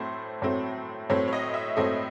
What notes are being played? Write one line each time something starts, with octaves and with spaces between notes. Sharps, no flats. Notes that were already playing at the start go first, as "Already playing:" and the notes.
Already playing: A2 F#3 A3 C4 C5
A2 F#3 A3 C4
A2 F#3 A3 C4 C#5
C#5
D#5
E5
A2 F#3 A3 C4 D#5